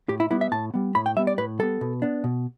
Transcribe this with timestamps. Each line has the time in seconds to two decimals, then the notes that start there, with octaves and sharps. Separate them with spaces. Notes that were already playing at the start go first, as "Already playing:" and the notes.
0.09 A2 G4
0.20 E4
0.31 G3 B3 E4
0.41 E5
0.52 A2 A5
0.74 G3 B3
0.95 A2 B5
1.06 G5
1.17 G3 B3 E5
1.27 D5
1.38 A2 B4
1.59 G3 B3 A4
1.81 B2
2.02 B3 D4
2.24 B2